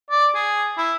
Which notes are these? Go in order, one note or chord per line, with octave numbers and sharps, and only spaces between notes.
D5
G#4
E4